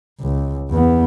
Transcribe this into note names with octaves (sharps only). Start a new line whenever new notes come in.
C#2
E2 B3